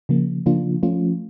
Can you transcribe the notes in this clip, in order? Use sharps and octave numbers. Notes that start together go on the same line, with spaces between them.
C#3 F3 A#3
C#3 F3 A#3 D4 F4
F3 A3 C#4 F4